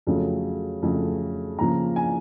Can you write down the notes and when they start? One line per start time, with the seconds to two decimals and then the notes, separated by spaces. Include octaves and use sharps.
0.07 F2 C#3 F#3 A3
0.82 F2 C#3 F#3 A3
1.59 C#3 F3 A#3 A#5
1.96 G#5